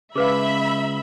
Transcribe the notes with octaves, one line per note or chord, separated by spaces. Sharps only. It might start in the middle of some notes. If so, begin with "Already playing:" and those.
C#3 G#3 G#4 B4 E5 F5 B5